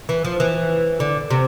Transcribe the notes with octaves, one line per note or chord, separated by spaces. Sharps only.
E3
F3
E3
D3
C3